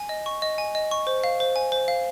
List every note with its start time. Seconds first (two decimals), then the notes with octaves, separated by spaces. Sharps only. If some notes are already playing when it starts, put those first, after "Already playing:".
Already playing: G#5
0.09 D#5
0.26 C#6
0.42 D#5
0.58 G#5
0.75 D#5
0.91 C#6
1.07 C5
1.24 F5
1.40 C5
1.56 G#5
1.72 C5
1.88 F5